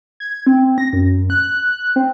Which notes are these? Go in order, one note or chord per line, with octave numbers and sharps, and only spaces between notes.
G#6
C4
A#6
F#2
F#6
C4